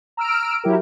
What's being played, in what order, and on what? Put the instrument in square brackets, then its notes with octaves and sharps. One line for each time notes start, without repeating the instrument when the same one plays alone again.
[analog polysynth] A#5 E6 F6 D7
F#3 E4 G4 A#4